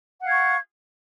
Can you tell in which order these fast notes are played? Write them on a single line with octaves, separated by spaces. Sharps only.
F#5 F5 G#6 C#6